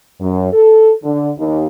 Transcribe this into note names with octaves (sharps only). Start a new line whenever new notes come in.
F#2
A4
D3
D#2